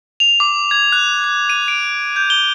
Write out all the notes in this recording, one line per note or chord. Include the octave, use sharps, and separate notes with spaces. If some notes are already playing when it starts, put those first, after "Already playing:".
F7
D6
G#6
F#6
F#6
D#7
D7
G6
G7